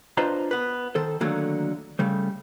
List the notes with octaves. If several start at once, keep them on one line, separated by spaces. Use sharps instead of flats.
D4 F4 B4 C5 D#5 A#5
B3 B4
D#3 A4 C5
D3 D#3 F#3 A3 A#3
C#3 G3 A3